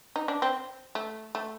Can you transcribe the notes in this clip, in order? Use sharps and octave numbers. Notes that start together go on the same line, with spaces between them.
D#4
D4
C4
A3
A3